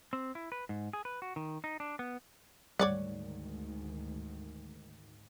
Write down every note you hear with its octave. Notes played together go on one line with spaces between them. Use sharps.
C4
E4
B4
G#2
G#4
B4
F#4
D#3
D#4
D4
B3
D2 G#2 D#3 G3 C#5 D5 F#5